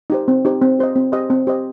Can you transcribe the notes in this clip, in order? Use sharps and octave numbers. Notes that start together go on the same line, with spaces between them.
D#4 G4 C5
C4
D#4 G4 C5
C4
G4 C5 D#5
C4
G4 C5 D#5
C4
G4 C5 D#5